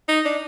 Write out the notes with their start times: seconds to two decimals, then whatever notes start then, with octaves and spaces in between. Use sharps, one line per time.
0.08 D#4
0.25 D4